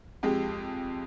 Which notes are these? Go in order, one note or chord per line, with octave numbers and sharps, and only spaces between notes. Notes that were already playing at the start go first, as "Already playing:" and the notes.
F2 G#3 G4